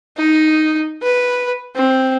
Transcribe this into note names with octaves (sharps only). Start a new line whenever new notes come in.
D#4
B4
C4